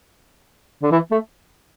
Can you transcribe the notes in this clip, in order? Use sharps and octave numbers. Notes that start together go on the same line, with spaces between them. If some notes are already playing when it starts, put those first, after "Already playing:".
D3
E3
A3